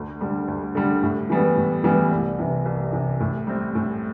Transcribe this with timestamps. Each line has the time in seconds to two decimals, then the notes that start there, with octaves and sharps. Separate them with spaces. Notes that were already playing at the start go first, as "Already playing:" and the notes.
Already playing: D2
0.21 D3 G3
0.48 D2
0.75 D3 G3
1.03 A2
1.30 E3 G3 B3
1.57 A2
1.84 E3 G3 B3
2.11 C2
2.38 C3 E3
2.66 C2
2.93 C3 E3
3.20 A2
3.47 G3 C4
3.75 A2